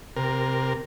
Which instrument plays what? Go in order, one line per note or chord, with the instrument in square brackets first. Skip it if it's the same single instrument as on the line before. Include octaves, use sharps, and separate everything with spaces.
[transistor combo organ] C3 A#4